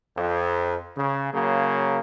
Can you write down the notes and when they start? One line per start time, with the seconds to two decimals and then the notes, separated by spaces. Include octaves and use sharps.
0.17 F2
0.97 C#3
1.33 C#3 F#3 A#3